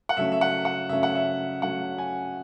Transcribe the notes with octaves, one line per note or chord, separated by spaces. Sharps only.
F#5
C#3 F#3 A3 C#4 E5
E5
F#5
F#5
C#3 F#3 A3 C#4 E5
F#5
E5
C#3 F#3 A3 C#4 F#5
G#5